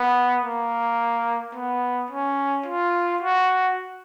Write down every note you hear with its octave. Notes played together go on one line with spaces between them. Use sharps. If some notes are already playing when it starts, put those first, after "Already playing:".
Already playing: B3
A#3
B3
C#4
F4
F#4